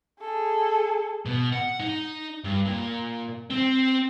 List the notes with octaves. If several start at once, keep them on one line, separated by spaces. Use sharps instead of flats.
G#4 A4
B2
F#5
D#4
G2
A#2
C4